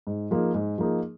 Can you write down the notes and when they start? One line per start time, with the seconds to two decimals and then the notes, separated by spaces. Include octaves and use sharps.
0.07 G#2
0.31 F3 A#3 D#4 G#4
0.54 G#2
0.78 F3 A#3 D#4 G#4